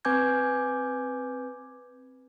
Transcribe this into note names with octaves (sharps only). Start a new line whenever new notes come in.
C4 B4 G#5 D6 G6 G#6